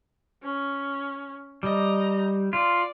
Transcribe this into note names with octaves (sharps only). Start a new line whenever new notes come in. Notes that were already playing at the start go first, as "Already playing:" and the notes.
C#4
G3 D#5 A#5
F4 D5